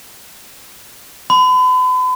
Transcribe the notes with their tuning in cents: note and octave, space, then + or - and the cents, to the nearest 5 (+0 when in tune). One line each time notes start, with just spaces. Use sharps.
B5 +40